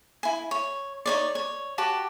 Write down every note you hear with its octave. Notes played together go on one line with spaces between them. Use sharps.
E4 G#5
C#5
D#4 C#5 D5
C#5
F#4 G4 A5 D6